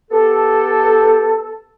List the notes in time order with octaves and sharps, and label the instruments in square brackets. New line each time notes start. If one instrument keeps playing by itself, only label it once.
[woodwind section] B3 G4 A4